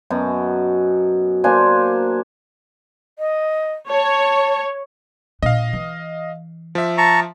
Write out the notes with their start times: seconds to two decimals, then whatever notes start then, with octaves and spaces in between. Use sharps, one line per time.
0.10 F#2 B2 A5
1.44 A#3 D4 C5 G#5
3.19 D#5
3.89 C#5 A5
5.43 A#2 D4 D#5 F5
5.73 E3
6.75 F3 E5
6.98 A5 A#5 C#6